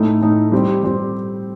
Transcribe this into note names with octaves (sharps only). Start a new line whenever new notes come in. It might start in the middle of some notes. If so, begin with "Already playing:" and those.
Already playing: A2 A3 D#4
A2 A3 D#4
G3 C4 G4
G3 C4 G4